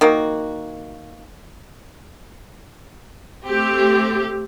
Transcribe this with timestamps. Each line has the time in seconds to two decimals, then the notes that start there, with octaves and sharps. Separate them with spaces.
0.01 D#3 A#3 F#4
3.44 A3 C4 G4